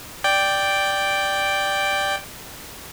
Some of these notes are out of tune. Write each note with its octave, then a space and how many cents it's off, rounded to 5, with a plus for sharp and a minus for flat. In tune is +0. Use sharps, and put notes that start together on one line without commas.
D5 +0 G5 +0